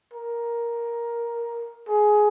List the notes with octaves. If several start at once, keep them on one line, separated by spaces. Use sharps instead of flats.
A#4
G#4